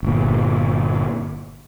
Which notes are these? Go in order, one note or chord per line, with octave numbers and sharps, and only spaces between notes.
G1 A#2